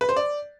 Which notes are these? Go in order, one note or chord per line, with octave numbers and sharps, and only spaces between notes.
B4
C5
D5